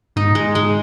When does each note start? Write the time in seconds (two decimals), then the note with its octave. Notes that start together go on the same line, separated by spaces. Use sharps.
0.16 G#2 D#4
0.35 G#3
0.55 G#3